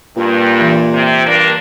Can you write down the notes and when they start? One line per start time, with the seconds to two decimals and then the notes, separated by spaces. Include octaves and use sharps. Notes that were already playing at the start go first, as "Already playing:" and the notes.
0.17 G2 A#2
0.60 E3
0.92 C3
1.26 G2 A#3 D4